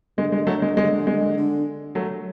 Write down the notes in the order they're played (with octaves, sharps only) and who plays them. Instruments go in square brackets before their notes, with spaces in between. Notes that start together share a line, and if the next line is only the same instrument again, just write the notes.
[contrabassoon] D3 [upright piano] G#3
[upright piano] G#3
F#3 A3
G#3
G#3
G#3
[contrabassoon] D3
[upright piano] F#3 A3